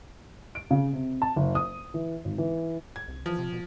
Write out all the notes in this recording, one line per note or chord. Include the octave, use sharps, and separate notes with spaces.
D7
C#3
C3
A5
F#1
D#6
E3
G#1
E3
G#6
C2
E3 F3
C3
B2